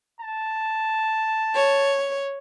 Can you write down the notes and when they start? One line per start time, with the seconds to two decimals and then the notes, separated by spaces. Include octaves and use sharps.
0.21 A5
1.54 C#5